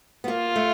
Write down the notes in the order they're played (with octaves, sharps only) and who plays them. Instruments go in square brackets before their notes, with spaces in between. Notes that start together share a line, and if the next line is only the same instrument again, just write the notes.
[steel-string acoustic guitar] B3
[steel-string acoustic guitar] A#3 [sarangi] F4
[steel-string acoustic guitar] A3